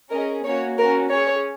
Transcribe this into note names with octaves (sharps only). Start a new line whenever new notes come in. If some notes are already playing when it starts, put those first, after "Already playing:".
C#4 G#4 A#4 D#5
A#3 C#4 F#4 C#5
C#4 F#4 A#4
C#4 G#4 C#5